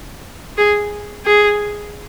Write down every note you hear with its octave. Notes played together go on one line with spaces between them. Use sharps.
G#4
G#4